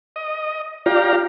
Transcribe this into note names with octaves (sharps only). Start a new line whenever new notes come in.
D#5
F4 G4 D5 F5 A#5